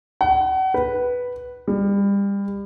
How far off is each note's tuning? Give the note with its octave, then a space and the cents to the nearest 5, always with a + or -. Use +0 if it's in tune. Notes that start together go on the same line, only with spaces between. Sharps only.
F#5 +35
B4 -5
G3 +30